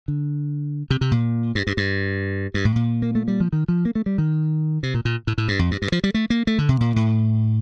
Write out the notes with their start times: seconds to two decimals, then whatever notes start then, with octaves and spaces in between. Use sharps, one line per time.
0.08 D3
0.90 C3
1.01 C3
1.11 A#2
1.55 G2
1.67 G2
1.77 G2
2.54 G2
2.65 A2
2.76 A#2
3.02 A#3
3.15 A3
3.28 G3
3.40 F3
3.53 D#3
3.68 F3
3.85 A#3
3.95 A3
4.06 G3
4.18 D#3
4.83 C3
4.94 A#2
5.05 A#2
5.27 A2
5.38 A2
5.48 G2
5.59 F2
5.71 G2
5.82 G2
5.92 F3
6.04 G3
6.14 A3
6.30 A#3
6.47 A3
6.58 D3
6.69 C3
6.81 A#2
6.96 A2